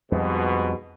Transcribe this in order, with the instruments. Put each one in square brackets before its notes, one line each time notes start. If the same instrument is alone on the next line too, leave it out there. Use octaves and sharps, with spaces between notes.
[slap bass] F2 G3 [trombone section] G#2 B2